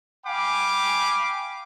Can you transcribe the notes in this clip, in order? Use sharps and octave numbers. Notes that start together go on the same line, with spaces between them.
F5 G5 G#5 B5 D6